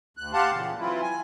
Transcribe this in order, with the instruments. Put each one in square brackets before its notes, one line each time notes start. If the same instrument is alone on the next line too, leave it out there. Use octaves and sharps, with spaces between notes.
[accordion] D2 F#6
G4 F5 F#5 A5 C6 F#6
A#2 C#3 E3
E3 F#3 C4 E4 F4
G#5